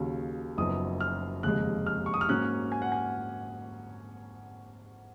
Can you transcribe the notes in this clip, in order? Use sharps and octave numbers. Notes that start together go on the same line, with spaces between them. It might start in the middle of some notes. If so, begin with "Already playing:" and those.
Already playing: D#2 C#3 F#3 C#4
F#1 F#2 F3 B3 D#4 D#6
F6
F1 D#2 C#3 G#3 F#6
F6
C#6
D#6
F6
G#2 F#3 A#3 C#4 F#6
G#5
F#5
G#5